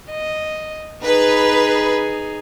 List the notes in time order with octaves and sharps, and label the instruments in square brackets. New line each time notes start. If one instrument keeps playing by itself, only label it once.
[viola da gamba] D#5
[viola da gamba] D#4 G#4 [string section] B4